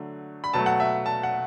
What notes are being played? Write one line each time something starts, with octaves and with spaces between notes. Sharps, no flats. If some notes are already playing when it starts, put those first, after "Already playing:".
Already playing: D3 F#3 A3
B5
B2 F#3 A3 A5
F#5
E5
A5
F#5